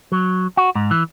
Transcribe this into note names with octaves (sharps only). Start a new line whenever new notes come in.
F#3
F#4
G#2
E3